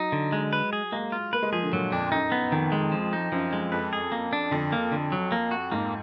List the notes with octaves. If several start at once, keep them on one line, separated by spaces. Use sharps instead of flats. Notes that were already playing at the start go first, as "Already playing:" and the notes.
Already playing: F#3 D#4
D3
G#3
B4
G#4
G#3 A#3
F4
A#3 B4
G#3
F3 G#4
D3
A#2 F#3
F2 D4
F#2 D#4
B3
F2 D#3
G#3
F3
D#4
F#2 F3
G#3
F2 B4
G#4
A#3
D4
F2 D3
A#3
D3
F#3
A#3
F#4
G#2 A#3